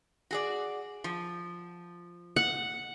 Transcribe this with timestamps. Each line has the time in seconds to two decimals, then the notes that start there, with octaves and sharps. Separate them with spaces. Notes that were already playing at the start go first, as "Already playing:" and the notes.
0.31 F#4 G#4 D5
1.04 F3
2.36 F#5